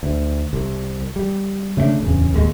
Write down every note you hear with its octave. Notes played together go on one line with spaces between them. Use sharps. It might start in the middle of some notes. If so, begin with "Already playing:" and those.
D2
C2
G3
C#3 A3 C4 D4
D1 E2 C#3
D1 D#2 G#3